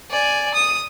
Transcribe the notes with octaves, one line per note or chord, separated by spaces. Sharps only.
D5 G#5
D#6